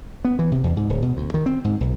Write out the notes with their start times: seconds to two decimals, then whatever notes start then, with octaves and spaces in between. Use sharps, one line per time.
0.25 B3
0.39 E3
0.52 C3
0.64 E2
0.77 G#2
0.90 D1
1.02 B2
1.17 D2
1.34 D#3
1.46 C4
1.64 G#2
1.81 B1